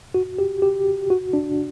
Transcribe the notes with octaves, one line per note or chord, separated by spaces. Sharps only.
F#4
G4
G4
F#4
D4